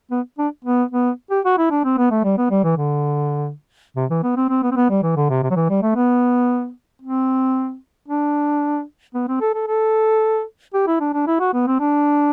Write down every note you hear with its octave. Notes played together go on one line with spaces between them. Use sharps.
B3
D4
B3
B3
G4
F#4
E4
D4
C4
B3
A3
G3
B3
G3
E3
D3
C3
E3
B3
C4
C4
B3
C4
B3
G3
E3
D3
C3
C3
F#3
E3
G3
A3
B3
C4
D4
B3
C4
A4
A4
A4
G4
E4
D4
D4
E4
F#4
B3
C4
D4